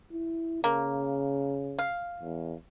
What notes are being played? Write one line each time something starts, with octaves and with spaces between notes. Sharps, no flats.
E4
C#3 A#3
F5
E2